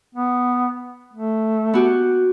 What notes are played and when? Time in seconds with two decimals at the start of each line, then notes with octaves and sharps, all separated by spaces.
0.15 B3
1.14 A3
1.74 B3 F#4 G4